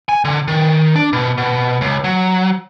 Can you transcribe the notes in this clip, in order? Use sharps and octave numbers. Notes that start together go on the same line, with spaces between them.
G#5
D3
D#3
D4
B2
B2
C#2
F#3